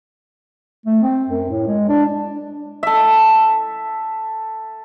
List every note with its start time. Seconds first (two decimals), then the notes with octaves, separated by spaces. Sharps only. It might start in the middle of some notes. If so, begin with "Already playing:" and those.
0.86 A3
1.02 C4
1.28 F#2
1.50 A2
1.67 G#3
1.88 D4
2.83 A4 E5